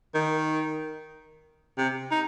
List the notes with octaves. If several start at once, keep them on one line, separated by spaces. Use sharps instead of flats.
D#3
C3
D#4